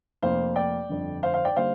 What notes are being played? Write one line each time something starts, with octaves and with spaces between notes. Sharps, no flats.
F1 F2 F3 A#3 C5 F5
D5 G5
G1 F2 D3
C5 F5
C5 F5
D5 G5
D3 G3 A#3 C5 F5